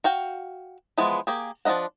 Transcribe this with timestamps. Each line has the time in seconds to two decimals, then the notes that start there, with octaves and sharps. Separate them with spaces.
0.04 F#4 F5 G5
0.98 E3 F3 G#3 B3
1.27 A#3 G4 G#4
1.65 F3 D4 D#4 D#5 F#5